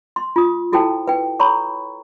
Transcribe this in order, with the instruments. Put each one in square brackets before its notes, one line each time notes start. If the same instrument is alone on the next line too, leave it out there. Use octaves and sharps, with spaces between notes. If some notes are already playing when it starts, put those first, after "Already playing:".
[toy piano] C6
F4 D#6
E4 F#4 A4 C5 G5 A5
B4 G5
A4 C#5 A#5 B5 C#6